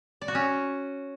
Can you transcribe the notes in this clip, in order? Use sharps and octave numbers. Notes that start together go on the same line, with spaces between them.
D5
F#4
C#4